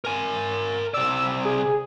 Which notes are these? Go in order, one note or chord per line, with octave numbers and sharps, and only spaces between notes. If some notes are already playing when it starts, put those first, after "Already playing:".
A#4 G#5
C3 D5 E6
G#4